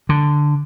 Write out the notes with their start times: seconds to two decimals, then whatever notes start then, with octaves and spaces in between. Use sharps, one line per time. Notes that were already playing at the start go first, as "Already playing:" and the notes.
0.09 D3